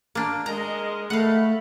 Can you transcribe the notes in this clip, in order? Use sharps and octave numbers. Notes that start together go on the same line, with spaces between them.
A#3 D4
G#3 A#4 D#5 A#5
A3 A4 F5 F#5 B5